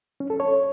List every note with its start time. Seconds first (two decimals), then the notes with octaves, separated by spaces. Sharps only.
0.20 C#4
0.30 A4
0.40 C#5